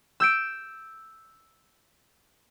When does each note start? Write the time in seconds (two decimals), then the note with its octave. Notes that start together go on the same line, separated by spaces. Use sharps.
0.20 E6 G6 D7